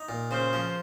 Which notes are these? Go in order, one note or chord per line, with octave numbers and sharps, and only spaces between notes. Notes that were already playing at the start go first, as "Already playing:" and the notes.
Already playing: D#4
A#2
C#3 C5
F3